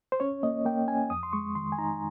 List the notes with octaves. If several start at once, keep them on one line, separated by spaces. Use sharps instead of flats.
C5
C#4 C#5
A#3 D#5
A#3 G5
C#4 G#5
F2 D#6
C6
G#3 C#6
D#3 C6
G#5
D#4 A#5